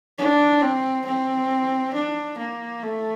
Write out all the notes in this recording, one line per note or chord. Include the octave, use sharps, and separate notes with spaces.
D4
C4
C4
D4
A#3
A3